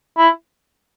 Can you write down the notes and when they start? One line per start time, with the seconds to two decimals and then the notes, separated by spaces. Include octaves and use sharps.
0.18 E4